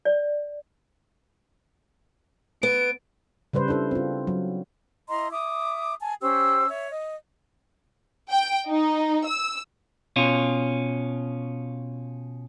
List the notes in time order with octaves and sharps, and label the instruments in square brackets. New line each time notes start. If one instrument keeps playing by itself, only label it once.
[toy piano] D5
[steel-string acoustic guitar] B3 [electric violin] D7
[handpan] C#3 G3 B4 C5
D4 E4 A4 C5
C4 F4
F#3
[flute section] E4 D#5 A#5 C6
E5 D6 D#6
G#5 A5
C#4 G4 C5 E6
C#5 E5
D#5
[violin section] G5
D#4
E6
[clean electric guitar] B2 C#4 F4